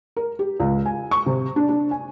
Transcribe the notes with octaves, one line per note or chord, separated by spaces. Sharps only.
A#4
G4
C#2
G#5
C#6
C3
D4
D4
G#5